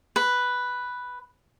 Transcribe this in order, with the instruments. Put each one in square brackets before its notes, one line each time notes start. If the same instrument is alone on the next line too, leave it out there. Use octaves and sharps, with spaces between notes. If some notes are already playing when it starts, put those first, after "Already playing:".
[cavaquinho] B4